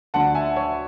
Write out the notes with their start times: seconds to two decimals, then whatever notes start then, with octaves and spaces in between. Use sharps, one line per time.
0.14 D2 D3 F#5 A5
0.35 E5 G#5
0.56 C#5 E5